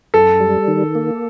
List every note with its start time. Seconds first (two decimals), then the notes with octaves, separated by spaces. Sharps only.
0.14 F#2 A4
0.40 G3
0.68 D#3
0.95 A#3